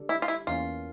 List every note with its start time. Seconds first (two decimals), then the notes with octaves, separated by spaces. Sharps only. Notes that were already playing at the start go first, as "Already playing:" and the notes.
Already playing: D3 G3 D4 A4
0.09 E4
0.22 F4
0.28 E4
0.47 E2 E3 A#3 C#4 F4